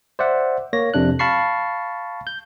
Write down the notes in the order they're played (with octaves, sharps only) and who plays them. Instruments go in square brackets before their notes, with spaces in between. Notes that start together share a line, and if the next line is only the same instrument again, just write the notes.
[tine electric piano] C5 D5 E5 F#5
A#3 C#5 A#6
F2 C3 D4 F#6
F5 A5 B5 C#6 C7
G6